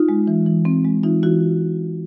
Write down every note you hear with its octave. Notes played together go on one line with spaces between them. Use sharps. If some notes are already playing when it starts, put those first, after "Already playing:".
Already playing: D#4 F4
G#3
E3
E3
C4
G#3
E3 D#4 F4
E3 E4 F#4